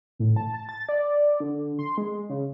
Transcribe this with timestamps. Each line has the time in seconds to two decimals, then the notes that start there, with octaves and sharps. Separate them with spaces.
0.19 A2
0.36 A5
0.54 A5
0.69 A6
0.89 D5
1.40 D3
1.79 C6
1.98 G#3
2.29 C#3